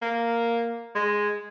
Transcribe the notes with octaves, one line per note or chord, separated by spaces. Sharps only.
A#3
G#3